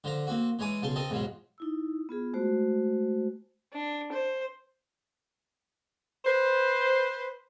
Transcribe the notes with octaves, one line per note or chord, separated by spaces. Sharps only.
D3 F3 C5 A#5
A#3 C4 F#4
E3 G#3 C#5 G#5 D6
B1 C#3 F5 A5 C6
C4 A#4 D#5 G5 A5
E2 G#2 B2 F3 F#3
D#4 E4 E6
B3 F4 G#4
G#3 A3 F#4 C5
D4
C5
B4 C5